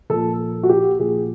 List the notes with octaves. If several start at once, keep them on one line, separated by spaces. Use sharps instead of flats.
A#2 F3 A4
F#4
G4
A#2 F3 G#4